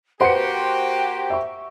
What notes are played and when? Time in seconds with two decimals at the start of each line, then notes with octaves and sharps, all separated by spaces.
0.21 A#3 F#4 G4 B4 C5 F#5 C6 C#7
0.50 G5
1.30 E5 C#6